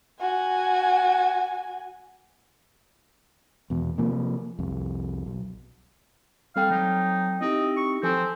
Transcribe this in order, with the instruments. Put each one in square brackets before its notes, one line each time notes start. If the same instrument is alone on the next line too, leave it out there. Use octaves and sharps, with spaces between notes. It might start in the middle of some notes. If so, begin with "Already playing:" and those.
[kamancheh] F#4 G#5
[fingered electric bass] E2 B2
C3 F3 A#3
C2 F2
B1
[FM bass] G3 [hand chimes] C4 A4 G5 [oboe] F5
[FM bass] F#3 [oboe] D#4
[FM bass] C4 [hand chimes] D#4 E4 G4 [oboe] D#5
[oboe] C#6
[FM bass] F3 [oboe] C4 [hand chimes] A4 G#5